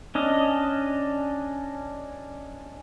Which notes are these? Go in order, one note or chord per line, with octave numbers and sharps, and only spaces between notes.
C#4 D4 D#5